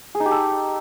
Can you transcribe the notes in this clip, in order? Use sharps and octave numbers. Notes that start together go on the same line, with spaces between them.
G#4
D#4
G4
A4